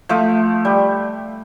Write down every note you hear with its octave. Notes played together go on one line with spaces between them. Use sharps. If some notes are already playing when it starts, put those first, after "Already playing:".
F3 A3
G3